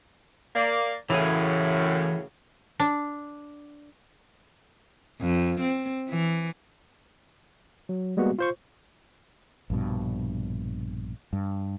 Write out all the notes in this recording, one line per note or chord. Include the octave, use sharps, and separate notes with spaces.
A#3 D5
F#2 A2 C#3 E3 G#4
D4
F2
C4
E3
F#3
G3 G#3 A#3 B3 F#4
F4 C5 C#6
A#1 G2 B2
G2